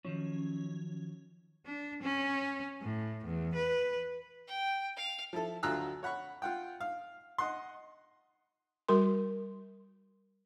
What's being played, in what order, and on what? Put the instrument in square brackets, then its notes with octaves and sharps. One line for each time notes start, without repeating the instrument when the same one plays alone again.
[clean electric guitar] D#3 F3 F#3 [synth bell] C#4
[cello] D4
C#4
A2
E2
B4
[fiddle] G5
F5
[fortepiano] F3 E4 A4
D2 F#3 F4 A#5 E6 F#6
C#5 F#5 B5 C#6
F4 F#5 G5
F5
D#5 F#5 C6
[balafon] G3 F#4 A#4 C6